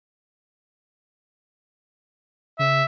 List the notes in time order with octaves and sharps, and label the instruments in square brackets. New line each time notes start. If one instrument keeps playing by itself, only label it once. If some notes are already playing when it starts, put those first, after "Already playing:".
[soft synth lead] C#3 [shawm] E5